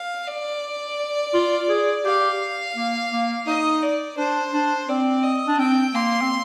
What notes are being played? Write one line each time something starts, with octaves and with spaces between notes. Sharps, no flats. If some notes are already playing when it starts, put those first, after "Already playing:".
Already playing: F5
D5
F4
G#4
G4 F5
A#3
A#3
D#4 D#5
D5
D4 C5
D4
C4 D5
D#5
D4
C4 G5
A#3 C6
C4